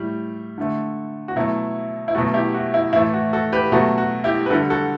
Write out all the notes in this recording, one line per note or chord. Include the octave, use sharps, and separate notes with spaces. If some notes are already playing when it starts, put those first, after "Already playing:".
Already playing: A2 G3
D3 A3
F#4
B2 F#3 A3 E4
E4
B2 F#3 A3 F#4
E4 G4
F#4
E4
A2 E3 A3 E4
F#4
F#4 A4
G4 B4
B2 F#3 A3 F#4 A4
F#4
E4 G4
B4
D3 G3 F#4 A4
F#4 A4